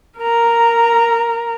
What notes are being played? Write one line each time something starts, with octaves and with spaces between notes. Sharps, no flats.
A#4 A#5